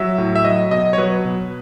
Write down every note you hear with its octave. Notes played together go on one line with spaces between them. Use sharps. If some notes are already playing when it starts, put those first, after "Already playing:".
Already playing: F#3 E5
A2
E5
F#3 D#5
B2 D#5
C#5
F#3 B4
B2